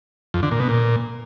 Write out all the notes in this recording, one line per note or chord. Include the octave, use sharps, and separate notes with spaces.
F2
D3
A#2
B2
A#2